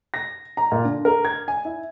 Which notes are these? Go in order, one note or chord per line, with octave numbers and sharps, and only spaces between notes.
A#6
A#5
A#2
D3
A#4
G#6
G#5
E4